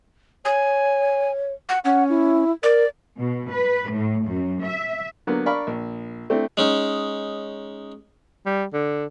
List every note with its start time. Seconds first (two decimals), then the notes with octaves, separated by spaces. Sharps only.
0.45 C#5 G#5
1.69 F#5
1.85 C#4 F#5
2.10 E4
2.63 A#4 D5
3.18 B2
3.50 B4
3.90 A2
4.26 F#2
4.63 E5
5.27 D3 F#3 A#3 B3
5.46 D4 A#4 D5 F5 B5 C#6
5.67 A#1
6.30 A3 C4 D4 E4
6.57 G#3 C#4 D#4
8.46 G3
8.74 D3